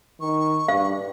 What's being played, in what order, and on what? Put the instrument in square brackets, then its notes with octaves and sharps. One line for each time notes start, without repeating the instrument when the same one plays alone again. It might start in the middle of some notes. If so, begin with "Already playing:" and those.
[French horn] D#3 [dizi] C#6
[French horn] G2 [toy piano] F5